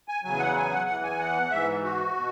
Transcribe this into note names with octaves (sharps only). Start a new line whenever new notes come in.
G#5
E2 C#3 F#3 G#5
F#5
G#5
F#5
E2 E3 F#5
G#5
F#5
G#2 E3 E5
F#4
B2